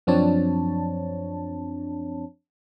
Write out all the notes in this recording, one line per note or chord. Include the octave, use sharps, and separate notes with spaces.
F#2 F3 C4 D4 C#5 A5